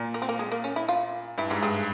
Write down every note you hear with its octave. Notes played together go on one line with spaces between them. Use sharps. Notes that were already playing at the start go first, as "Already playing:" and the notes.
Already playing: A#2
A#3
C4
A#3
G#3
A#3
C#4
E4
F4
G2 E4
G#2 G3
G2 G#3